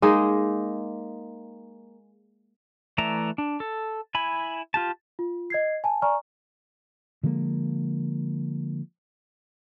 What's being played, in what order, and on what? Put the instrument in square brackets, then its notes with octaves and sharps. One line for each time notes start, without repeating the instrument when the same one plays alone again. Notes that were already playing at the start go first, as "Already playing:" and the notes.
[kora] G#3 A#3 D#4 D#5
[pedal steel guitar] E3 A3 D5 E5 A#5
D4
A4
E4 G#5 B5
F4 G4 A5
[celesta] F4
D#5 G#6 C7
G#5 A5
D5 G#5 A#5 C#6 F6
[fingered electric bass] D3 F3 G#3 A#3